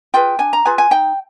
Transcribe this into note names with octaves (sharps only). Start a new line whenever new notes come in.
F4 G#4 B4 G5
D4 G#5
A#5
F4 G#4 B4 G#5
G#5
D#4 G5